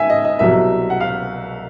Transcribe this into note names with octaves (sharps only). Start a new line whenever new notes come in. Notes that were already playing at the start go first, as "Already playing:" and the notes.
Already playing: G#2 G#3 E5 G#5
D#5
D#5
C2 B2 F#3 E5
F#5
F5